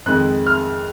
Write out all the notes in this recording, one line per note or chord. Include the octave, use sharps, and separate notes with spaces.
F2 D#3 G#3 F#6
F6